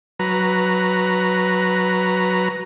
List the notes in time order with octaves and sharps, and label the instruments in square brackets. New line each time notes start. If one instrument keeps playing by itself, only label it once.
[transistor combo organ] F#3 B4 A#5